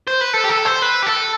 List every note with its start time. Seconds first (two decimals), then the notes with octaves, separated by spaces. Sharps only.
0.08 C5
0.21 B4
0.34 A4
0.45 G4
0.50 A4
0.66 C5
0.82 B4
1.03 G4
1.07 A4